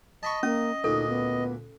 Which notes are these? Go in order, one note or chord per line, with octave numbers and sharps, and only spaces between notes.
D#5 A5 B5 C#6
A#3 C#4 D#6
D2 A#2 D#4 A4
B3